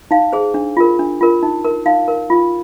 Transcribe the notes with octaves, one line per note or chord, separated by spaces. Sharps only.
D#4 F5
G#4 C5
D4
F4 A#4
D4
F4 A#4
D#4
A#4
D#4 F5
A#4
F4